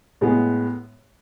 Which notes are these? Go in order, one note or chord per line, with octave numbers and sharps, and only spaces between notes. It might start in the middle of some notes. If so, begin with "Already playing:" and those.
A2 G#3 B3